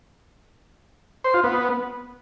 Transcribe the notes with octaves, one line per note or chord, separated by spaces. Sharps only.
C5
F4
B3